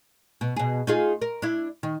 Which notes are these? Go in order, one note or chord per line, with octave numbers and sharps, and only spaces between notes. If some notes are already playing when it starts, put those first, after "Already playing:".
B2
B2 G#4
D#4 F4 G#4
A#4
D4 E4
D#3